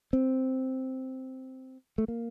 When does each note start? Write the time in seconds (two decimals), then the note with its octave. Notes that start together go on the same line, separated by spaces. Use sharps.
0.13 C4
1.98 A3
2.08 A#3